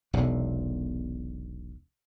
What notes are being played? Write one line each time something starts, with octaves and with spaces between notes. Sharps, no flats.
E1 B1 C3